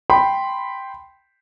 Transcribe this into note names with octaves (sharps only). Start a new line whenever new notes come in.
G5 B5 C6